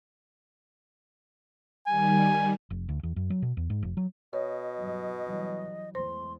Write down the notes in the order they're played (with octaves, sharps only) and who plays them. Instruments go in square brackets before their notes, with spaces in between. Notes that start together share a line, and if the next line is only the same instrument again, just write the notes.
[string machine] D#3 G3 [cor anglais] G#5
[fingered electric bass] F1
D2
E2
F#2
F#3
B2
E2
G#2
F1
F#3
[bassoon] B2 [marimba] C#5 [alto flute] D#5
[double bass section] G2 E3 F#3
E3 F#3 G3
[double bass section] E2 G#3 A3 [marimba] C5 [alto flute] C6